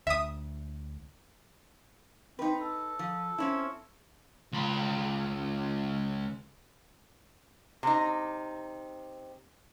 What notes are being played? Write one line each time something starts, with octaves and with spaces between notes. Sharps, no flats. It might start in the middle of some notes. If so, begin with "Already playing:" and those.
D2 E5 D#6
C4 D#4 B4
A4
F3
C4 C#4 E4
C#2 B5
C3 D#4